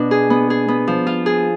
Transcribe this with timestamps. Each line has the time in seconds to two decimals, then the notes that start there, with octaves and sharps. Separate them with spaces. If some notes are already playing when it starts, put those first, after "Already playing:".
Already playing: B2 B3 D4
0.11 G#4
0.30 B3
0.50 G#4
0.68 B3
0.88 F3
1.07 F4
1.26 G#4